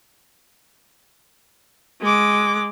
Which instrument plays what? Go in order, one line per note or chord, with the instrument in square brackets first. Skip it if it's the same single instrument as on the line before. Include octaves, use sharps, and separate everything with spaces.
[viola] G#3 D6